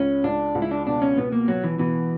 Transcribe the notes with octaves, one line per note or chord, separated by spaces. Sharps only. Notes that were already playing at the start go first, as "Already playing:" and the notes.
Already playing: C#2 C#4
C#2 D4
C#2
E4
D4
B2 D4
C#4
B2 B3
A#3
B2 F#3
E3
B2 E3